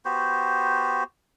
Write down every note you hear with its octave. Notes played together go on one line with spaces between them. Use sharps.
B3 F#4 G4 C5